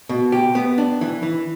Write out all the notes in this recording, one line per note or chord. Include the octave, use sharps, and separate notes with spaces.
B2
G4
B3
D4
E3
E3